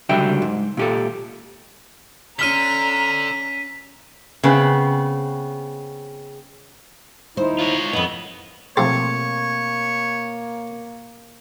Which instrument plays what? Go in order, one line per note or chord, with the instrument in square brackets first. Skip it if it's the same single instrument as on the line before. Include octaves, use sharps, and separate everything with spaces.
[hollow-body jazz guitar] C#2 D3 F#3 G3 E5 G5
G#2
A#2 G4 A4
[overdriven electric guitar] D3 [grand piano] C#4 F6 G7 [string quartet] A#5 [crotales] B6 D#7
[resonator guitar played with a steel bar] C#3 B3 C4
[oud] D#2 C5 [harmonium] D#4 E4
[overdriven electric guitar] F4 C#5
[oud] F2 B4 [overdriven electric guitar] B3 [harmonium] D#5
[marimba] B2 A3 C4 [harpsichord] F3 E4 G4 [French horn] A#3 [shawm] C#5